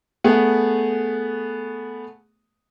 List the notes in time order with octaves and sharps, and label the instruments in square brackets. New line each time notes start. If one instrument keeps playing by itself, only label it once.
[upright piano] A3 B3 G#4